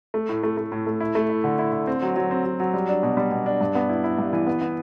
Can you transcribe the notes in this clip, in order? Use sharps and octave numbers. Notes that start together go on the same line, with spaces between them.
A3
A2
A3
A3
A2
A3
E4
A3
E4
D3
E4
D3
C4
F#3
F#3
C4
F#3
F#3
G3
D4
B2
G3
B2
D4
G2
B3
E4
E4
G2
E3
B3
B3